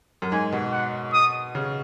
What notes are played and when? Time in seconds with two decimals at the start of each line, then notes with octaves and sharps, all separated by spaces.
0.22 F#2
0.32 G#2 G#5
0.52 B2
0.73 F#5
1.13 D#6
1.55 C#3